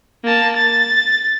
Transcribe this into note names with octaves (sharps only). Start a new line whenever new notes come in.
A#3 A5
A6